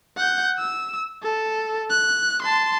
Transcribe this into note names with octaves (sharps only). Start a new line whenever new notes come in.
F#5 G6
E6
A4
F#6
A5 C6